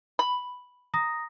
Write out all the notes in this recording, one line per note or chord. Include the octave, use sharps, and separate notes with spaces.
B5
A#5 D#6 A#6